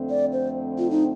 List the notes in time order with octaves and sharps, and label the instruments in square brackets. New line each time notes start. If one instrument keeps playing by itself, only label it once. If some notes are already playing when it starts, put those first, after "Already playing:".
Already playing: [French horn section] F2 D3 A3 C4
[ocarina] D5
C5
F4
D#4